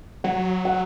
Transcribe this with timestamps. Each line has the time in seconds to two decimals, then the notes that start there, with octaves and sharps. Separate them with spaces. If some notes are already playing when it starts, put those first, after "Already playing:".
0.24 F#3 F#5
0.65 F#5